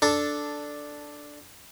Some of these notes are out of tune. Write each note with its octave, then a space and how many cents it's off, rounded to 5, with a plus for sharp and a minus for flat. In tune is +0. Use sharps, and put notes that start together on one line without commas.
D4 +0 A4 +0